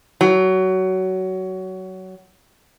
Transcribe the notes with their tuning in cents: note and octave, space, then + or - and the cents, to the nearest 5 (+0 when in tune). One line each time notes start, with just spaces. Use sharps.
F#3 +20